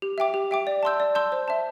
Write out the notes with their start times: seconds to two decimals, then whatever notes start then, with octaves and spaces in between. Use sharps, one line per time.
0.02 G4
0.18 E5 G5 D6
0.34 G4
0.51 E5 G5 D6
0.67 D5
0.83 A5 C6 E6 G6
1.00 D5
1.15 A5 C6 E6 G6
1.32 C5
1.48 E5 A5